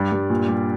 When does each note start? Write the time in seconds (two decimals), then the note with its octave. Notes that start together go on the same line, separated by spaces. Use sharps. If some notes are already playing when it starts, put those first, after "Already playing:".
Already playing: G2 D5
0.12 G2
0.30 A#2
0.48 G3